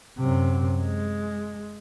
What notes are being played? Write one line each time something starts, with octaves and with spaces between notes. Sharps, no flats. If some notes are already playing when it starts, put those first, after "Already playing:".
F#2 C3
G#3